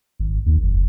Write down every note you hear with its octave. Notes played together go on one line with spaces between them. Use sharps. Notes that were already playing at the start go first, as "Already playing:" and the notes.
G#1
D#2
F#1